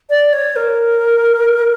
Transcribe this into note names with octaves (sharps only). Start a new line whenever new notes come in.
D5
C#5
A#4